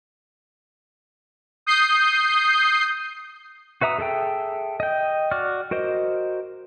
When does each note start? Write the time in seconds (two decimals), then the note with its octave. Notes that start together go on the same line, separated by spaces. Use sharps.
1.66 D#6 G6 C7
3.81 F#4 B4 E5 A#5 D#6
3.99 G#4 A4 E5 G5
4.80 D#5 G5
5.31 F#4 D5 F6
5.71 F#4 A#4 C5 D#5